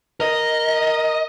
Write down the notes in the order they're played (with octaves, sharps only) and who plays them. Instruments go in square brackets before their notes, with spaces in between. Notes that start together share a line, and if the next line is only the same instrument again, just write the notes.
[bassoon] A#4 [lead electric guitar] D#5